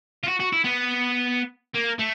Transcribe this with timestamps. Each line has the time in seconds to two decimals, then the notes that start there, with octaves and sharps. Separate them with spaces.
0.23 F4
0.28 F#4
0.40 F#4
0.52 E4
0.64 B3
1.75 A#3
1.99 A3